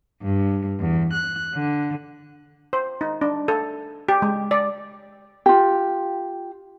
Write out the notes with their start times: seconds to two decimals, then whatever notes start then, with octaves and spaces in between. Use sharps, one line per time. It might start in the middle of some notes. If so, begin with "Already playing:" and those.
0.22 G2
0.80 E2
1.13 F#6
1.54 D3
2.73 C5
3.01 D#4
3.21 D4
3.48 A4
4.09 G4
4.22 G#3
4.51 D5
5.46 F4 G4